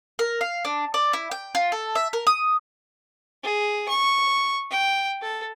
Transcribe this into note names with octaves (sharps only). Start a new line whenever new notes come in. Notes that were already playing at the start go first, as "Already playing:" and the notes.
A#4
F5
D4
D5
E4
G5
F4
A4
E5
A#4
D#6
G#4
C#6
G5
A4